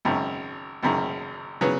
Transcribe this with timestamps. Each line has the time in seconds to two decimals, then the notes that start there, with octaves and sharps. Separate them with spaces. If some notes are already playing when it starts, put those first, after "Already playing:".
0.05 G#1 F#2 C#3
0.83 G#1 F#2 C#3
1.61 C#3 F#3 B3